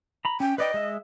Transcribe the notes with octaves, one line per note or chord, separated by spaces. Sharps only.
A#5 B5
C#4 G5
B4 D5 D#5 G5
G#3 E5